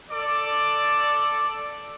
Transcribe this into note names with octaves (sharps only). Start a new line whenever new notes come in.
A4 D5 D6